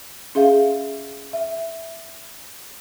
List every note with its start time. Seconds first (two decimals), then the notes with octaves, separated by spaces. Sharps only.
0.35 C#4 G#4 E5 F5
1.33 E5